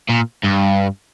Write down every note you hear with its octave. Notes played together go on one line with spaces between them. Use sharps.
A#2
G2